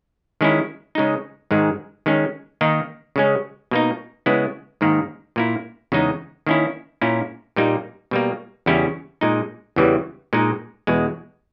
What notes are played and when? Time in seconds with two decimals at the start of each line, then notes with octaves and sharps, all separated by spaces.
0.41 D#3 G#3 C#4 E4
0.95 C#3 G#3 D#4
1.51 G#2 D#3 G#3
2.06 D#3 G#3 C#4
2.61 D#3 A#3 D#4
3.16 C#3 G#3 C#4
3.71 B2 A#3 D#4
4.26 C#3 G#3 B3 E4
4.81 G#2 D#3 A#3
5.36 A#2 A#3 E4
5.92 E2 C#3 G#3 D#4
6.47 D#3 A#3 C#4 E4
7.01 A#2 A#3 C#4 E4
7.56 A#2 G3 A#3 D#4
8.11 B2 G3 A#3
8.66 E2 C#3 G3 C#4 E4
9.21 A#2 G#3 D#4
9.76 E2 C#3 E3 G3
10.33 A#2 G#3 D#4
10.87 E2 B2 G#3